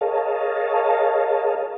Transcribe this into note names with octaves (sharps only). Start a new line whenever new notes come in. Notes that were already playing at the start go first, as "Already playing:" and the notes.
G#4 A#4 C#5 D#5 F5 A5